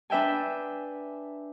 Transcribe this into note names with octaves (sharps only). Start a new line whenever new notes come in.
D4 B4 E5 G5 G#5